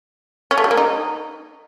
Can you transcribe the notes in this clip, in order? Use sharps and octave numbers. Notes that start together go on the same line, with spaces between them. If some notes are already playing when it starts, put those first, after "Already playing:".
C#4
A3
G3
A#3
D#4